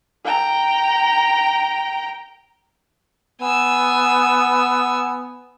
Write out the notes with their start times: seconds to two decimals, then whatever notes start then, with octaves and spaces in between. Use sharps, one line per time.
0.25 G5 A#5
3.41 B3 G#5 E6